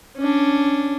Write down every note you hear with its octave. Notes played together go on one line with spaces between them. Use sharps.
C#4 D4